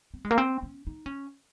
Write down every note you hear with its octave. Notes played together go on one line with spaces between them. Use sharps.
C4
G#3
A#3
C4
C#4
D#4
C#4